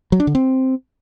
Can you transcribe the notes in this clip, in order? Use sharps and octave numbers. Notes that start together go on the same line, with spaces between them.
F#3
D4
D3
C4